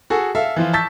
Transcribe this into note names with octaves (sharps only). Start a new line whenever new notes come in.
F#4 G#4 A4
A4 E5 F5
E3 F3 F4
A5 C#6 E6 G6 A6 B6